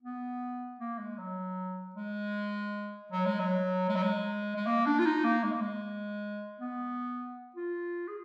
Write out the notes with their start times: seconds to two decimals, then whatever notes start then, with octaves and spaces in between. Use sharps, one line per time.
0.02 B3
0.80 A#3
0.99 G#3
1.18 F#3
1.96 G#3
3.12 F#3
3.26 G#3
3.39 F#3
3.89 G#3
3.96 F#3
4.03 G#3
4.56 G#3
4.67 A#3
4.86 D4
4.99 F4
5.05 D#4
5.24 A#3
5.44 G#3
5.52 A#3
5.61 G#3
6.60 B3
7.56 F4
8.08 G#4